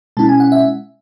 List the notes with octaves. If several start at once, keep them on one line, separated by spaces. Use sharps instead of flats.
B2 G#3 C#4 E4 A5
G#5
F#5
E5